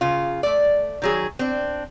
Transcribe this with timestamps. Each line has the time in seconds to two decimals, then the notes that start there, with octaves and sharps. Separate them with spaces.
0.01 C#3 F4
0.43 A3 D5
1.02 D#3 F#3 G#4
1.39 C4 D4